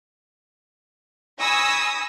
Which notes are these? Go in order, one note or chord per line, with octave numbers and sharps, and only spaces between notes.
G#5 B5 C#6 D#6 E6 A#6